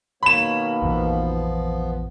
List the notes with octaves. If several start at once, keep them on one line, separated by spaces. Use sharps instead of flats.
B2 D#3 A#3 C#5 B5 E7
A#1 F2 E3 F3 B3